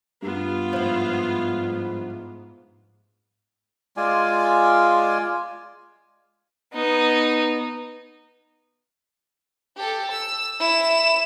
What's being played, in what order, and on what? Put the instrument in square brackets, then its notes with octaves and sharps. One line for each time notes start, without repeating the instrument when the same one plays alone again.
[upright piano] G2 [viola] B3 F4
[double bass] G#2 [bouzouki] F3 E4
[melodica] G#3 F4 D5 G#5
[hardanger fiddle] B3 D#4
[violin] G4 A4
E6
E4 E7